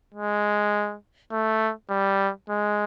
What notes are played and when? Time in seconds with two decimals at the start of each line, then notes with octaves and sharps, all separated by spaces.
0.14 G#3
1.31 A3
1.90 G3
2.49 G#3